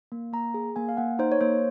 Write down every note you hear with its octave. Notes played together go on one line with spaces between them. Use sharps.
A#3
A#3 A#5
G#4
A#3 G#5
F5
A#3 F#5
D#4 C5
C#5
A#3 C5